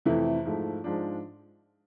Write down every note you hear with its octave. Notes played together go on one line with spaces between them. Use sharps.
F2 C3 E3 A3 E4
G#2 F3 A3
G#2 F3 G#3 D4